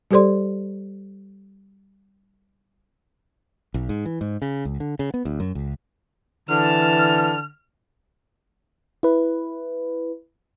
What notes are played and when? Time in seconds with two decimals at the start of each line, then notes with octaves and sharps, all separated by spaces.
0.11 G3 G4 A4 C5 D5 C6
3.74 B1
3.89 G#2
4.05 E3
4.21 G#2
4.42 C#3
4.65 C#2
4.80 D3
4.99 C#3
5.14 B3
5.25 D2
5.40 F#2
5.55 C#2
6.49 D3 E3 A5 F6
9.03 E4 B4